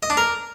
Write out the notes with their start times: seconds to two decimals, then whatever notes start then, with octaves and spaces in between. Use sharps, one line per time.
0.03 D#5
0.10 D4
0.17 A#4